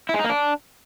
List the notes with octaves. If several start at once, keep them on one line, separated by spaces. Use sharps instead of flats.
E4
G#3
D#4
A#3
D4